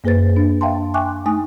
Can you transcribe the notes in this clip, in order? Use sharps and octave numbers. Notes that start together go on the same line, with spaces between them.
F#2 A#3 G#4 B4 C5 A6
D4
E5 F5 G5 A5 C6
E5 G5 G#5 C#6 D6 F#6
A3 D#4 G#5 D#6